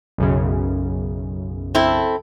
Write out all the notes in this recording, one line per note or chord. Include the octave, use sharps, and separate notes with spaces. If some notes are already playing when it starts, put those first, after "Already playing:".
B1 F#2 C#3
C4 E4 A4